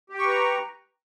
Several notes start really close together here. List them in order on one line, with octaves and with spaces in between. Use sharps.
G4 G5 C#6 B4 A#5